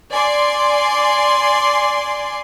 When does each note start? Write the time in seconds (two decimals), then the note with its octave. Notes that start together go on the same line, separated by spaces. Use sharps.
0.12 D5 G#5 C6